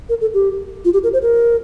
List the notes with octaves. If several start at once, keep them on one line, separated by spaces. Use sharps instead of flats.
A#4
A4
G4
F4
G4
A#4
C5
A#4